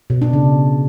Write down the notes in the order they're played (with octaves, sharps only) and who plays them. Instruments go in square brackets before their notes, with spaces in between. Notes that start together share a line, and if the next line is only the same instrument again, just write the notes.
[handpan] B2
D4
C#3